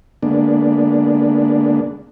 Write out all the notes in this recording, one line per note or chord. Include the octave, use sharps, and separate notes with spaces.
D3 G#3 A#3 B3 D4